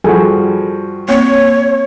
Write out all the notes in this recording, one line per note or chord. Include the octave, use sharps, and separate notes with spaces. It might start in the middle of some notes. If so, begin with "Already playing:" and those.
G2 F3 F#4 G#4 A4 G#5
A#3 C4 C#5